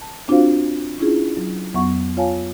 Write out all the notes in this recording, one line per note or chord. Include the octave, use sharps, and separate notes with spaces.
A5
C4 D4 F4 F#4 C5 F5
C#4 D4 E4 F4 G#4
F#3
F2 F#3 B3 E5 F#5 C#6
F4 C#5 F5 G#5 A5